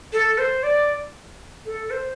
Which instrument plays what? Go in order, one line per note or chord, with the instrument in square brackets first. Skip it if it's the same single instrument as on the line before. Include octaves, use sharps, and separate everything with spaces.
[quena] A4
C5
D5
A4
C5